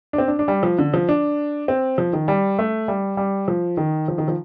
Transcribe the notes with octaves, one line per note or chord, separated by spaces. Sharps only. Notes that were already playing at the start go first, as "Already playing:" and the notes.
D4
C4
D4
D4
G3
F3
D3
F3
D4
C4
F3
D#3
G3
A3
G3
G3
F3
D#3
F3
D#3
F3